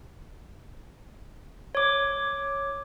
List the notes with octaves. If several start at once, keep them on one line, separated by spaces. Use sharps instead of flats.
C#5 D6